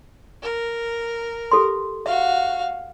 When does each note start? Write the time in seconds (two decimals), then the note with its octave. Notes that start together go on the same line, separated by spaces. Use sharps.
0.42 A#4
1.51 G4 A4 C6
2.06 F#4 E5 F5